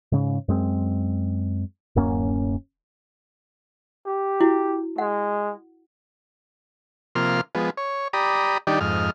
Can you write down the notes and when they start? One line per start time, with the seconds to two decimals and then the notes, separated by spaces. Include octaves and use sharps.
0.12 G#2 C#3
0.48 F#2 G#3 C4
1.96 D1 F#2 A#3 C#4
4.06 G4
4.41 E4 F#4
4.98 G#3 F#5
7.15 C3 F3 A#3 C6 F6
7.55 F3 G#3 B3
7.77 C#5
8.13 G4 D5 A#5 B5 D#6
8.67 D#3 G3 D4 D#4 G4 D5
8.81 F2 G#2 D#5 F6